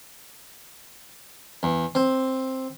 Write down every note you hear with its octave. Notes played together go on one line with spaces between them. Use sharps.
E2
C4